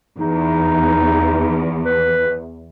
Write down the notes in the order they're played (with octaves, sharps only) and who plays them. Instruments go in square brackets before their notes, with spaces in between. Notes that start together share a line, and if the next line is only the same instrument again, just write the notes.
[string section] E2 [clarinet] D#4
[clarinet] B4